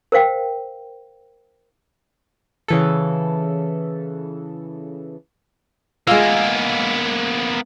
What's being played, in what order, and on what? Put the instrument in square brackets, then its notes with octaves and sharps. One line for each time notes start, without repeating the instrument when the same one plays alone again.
[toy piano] A#4 C5 F5 G5
[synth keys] C#3 E3 A4
[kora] G#3 F5 [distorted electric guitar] A#3 B3 [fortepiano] F4 E6